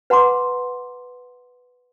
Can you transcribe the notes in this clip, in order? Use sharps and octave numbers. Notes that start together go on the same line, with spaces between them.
B4 F#5 A#5 C6 D6